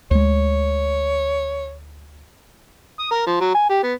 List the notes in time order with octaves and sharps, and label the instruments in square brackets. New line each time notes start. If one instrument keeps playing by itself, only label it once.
[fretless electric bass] D2 G#3 [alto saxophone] C#5
[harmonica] D#6
A#4
F3
F#3
G#5
G4
B3